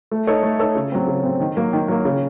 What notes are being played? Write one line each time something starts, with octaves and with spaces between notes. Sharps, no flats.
A3
D#4 A4 C#5
A3
D#4 A4 C#5
C#3
F#3 C4
C#3
F#3 C4
D#3
F#3 A#3
D#3
F#3 A#3
C#3